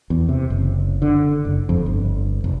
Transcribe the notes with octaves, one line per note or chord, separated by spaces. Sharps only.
E2
C3
F#1
D3
F#1
F2
G1
F1